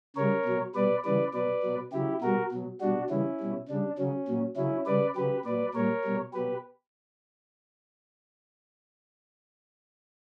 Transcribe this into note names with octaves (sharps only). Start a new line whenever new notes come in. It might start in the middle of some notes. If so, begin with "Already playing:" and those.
C#3 G3 A#4 C#5
B2 F#3
B2 G3 B4 D5
C#3 E3 G3 B4 D5
B2 F#3 B4 D5
B2 F#3
C#3 F#3 E4 G4
B2 G3 F#4 A#4
B2 F#3
B2 G3 D4 F#4
C#3 E3 G3 C#4 E4
B2 G3
C#3 G3 D4
C#3 F#3 C#4
A#2 F#3
C#3 F#3 C#4 E4
C#3 G3 B4 D5
C#3 F#3 G4 B4
A#2 F#3 B4 D5
A#2 G3 A#4 C#5
B2 G3
B2 F#3 G4 B4